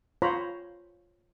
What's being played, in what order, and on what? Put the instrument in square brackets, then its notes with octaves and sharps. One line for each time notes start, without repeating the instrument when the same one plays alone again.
[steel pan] F4 C5 C#5 A#5 B5